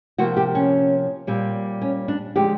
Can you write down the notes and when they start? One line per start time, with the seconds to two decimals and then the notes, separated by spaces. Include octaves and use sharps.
0.18 C3 F3 A#3 F#4
0.37 G4
0.55 C#4
1.27 A#2 G3 C4
1.82 C#4
2.08 D4
2.36 D3 F3 G#3 G4